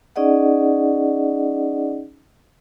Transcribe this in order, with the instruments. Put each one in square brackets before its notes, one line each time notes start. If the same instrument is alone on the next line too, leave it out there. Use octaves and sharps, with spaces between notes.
[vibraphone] C#4 D#4 G#4 D5 D#5 F#5